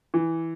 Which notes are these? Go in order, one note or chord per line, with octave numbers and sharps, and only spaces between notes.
E3